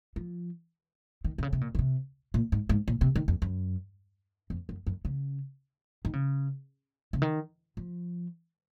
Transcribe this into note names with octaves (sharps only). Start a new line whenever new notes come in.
F3
D#3
C3
C#3
C3
A#2
C#3
C3
A#2
G#2
G#2
A#2
C3
D#3
F2
F#2
F2
F#2
F#2
C#3
D#3
C#3
C#3
D#3
F3